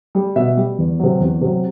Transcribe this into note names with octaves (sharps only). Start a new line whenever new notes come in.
G3
B2 E5
G3
E2
C3 F#3
E2
C3 F#3